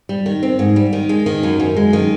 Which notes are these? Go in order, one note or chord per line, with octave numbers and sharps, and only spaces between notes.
G3
D#3
C4
G#2
G3
D#3
G#3
D#3
F#2
F#2
G#3
D#3